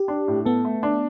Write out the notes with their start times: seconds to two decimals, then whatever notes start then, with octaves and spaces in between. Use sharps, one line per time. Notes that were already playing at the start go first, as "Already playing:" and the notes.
Already playing: G4
0.08 D4
0.28 A2
0.45 B3 A4
0.65 A3
0.83 D4